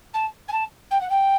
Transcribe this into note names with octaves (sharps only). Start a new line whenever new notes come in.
A5
G#5
A5
G5
F#5
G5